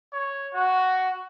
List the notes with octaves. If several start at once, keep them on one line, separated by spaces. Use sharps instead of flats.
C#5
F#4